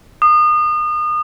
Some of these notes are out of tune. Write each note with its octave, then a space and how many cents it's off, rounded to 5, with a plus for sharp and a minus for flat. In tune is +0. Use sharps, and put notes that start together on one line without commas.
D#6 -30